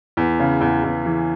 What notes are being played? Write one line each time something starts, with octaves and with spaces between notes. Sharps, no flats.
E2
C#3
E2
E2
E3